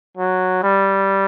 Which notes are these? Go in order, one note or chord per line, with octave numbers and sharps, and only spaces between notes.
F#3
G3